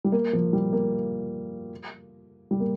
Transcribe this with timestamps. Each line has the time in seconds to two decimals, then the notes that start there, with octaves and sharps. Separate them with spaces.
0.05 G3
0.12 A#3
0.33 F3
0.53 G3
0.73 A#3
2.51 G3
2.60 A#3